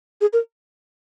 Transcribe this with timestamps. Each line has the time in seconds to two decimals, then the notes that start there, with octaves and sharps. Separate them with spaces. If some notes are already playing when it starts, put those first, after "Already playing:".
0.21 G#4
0.33 A#4